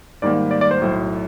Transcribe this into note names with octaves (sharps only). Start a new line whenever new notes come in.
G#2 D#3 G3 A#3 D5
D5
D5
C5
B1 A2 F#3